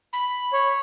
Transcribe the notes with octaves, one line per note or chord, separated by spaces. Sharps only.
B5
C#5